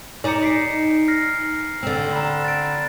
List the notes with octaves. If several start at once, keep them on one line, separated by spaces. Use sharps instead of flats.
D#4 D5 G#5 A#5 C#7
B6 C7 D7
F6 A#6 C7
D3 C4
A#5 B5
A6 D7